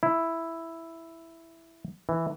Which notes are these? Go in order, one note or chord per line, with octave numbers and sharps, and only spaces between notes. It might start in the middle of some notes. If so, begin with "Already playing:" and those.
E4
E3